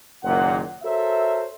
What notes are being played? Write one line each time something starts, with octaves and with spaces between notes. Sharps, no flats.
F#1 A#2 D#3 F#5
F#4 A4 A#4 C5 C#5 E5